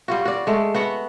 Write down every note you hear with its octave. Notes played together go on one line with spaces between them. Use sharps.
G3 F4 F#4
F#4 D5
G#3 A3
B3 F#4 F#5